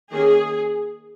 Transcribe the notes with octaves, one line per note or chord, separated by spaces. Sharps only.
D#3 A#3 C#4 G#4